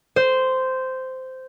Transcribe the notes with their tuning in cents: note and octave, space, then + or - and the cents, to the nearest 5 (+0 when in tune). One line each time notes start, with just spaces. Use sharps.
C5 -10